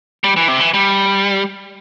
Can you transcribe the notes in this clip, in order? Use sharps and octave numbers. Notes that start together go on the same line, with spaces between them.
G3
E3
C3
E3
G3